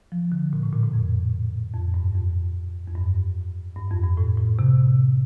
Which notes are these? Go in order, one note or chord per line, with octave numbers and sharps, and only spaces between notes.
F3
D3
A#2
A2
A#2
A2
F2
F2
G2
F2
F2
G2
G2
F2
G2
A2
A2
C3